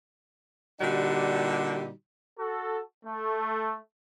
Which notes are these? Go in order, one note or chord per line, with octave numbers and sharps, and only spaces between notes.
A#2 D3 G3 D#4 F#4 G4
F#4 A4
A3